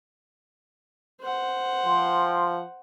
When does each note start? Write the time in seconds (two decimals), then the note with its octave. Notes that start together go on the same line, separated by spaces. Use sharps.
1.22 C5 F#5
1.86 F3 G5 C6